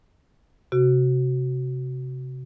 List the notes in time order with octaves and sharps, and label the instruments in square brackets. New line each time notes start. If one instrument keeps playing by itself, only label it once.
[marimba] C3 F#4